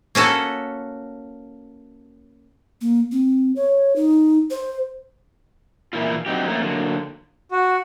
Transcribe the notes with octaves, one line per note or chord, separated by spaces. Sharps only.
A#3 C#4 F#4 A4
A#3
C4
C#5
D#4
C5
A#2 E3 A#3 E4 F4
D3 F#3 C4 D#4 G4
A3 A#3 C#4
D3 F#3 A#3
F#4